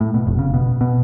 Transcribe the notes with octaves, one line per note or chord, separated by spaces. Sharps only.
A2
B2
F1
C#3
B2
B2